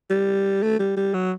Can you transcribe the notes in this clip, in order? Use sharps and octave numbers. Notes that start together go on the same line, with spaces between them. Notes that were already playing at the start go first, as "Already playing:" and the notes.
G3
A3
G3
G3
F#3